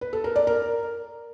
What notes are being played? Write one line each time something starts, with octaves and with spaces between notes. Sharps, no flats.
B4
A4
A#4
D5
A#4